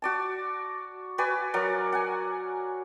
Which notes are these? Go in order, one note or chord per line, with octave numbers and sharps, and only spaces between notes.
F#4 D5 A5
F#4 B4 D5 G#5
F#3 A#4 D5 F#5
F#5 G#5